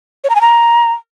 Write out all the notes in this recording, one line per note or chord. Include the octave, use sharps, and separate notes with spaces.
C#5
A#5
G#5
A#5